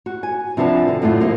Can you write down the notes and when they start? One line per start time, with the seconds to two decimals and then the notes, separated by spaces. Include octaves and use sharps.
0.06 F#4
0.23 G#5
0.57 C3 F3 D4 F#4 B4 A5
0.88 D3
1.02 F#2 A2 F#3 A3 F4 F#4
1.20 F3 A#3 D#4 G4